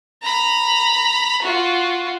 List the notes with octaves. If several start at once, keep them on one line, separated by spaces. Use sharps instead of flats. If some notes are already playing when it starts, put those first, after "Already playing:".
A#5 B5
F4 F#4